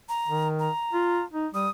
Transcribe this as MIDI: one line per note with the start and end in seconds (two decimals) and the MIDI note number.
0.09 0.48 82
0.28 0.69 51
0.60 1.24 82
0.93 1.23 65
1.33 1.47 63
1.54 1.68 55
1.54 1.70 87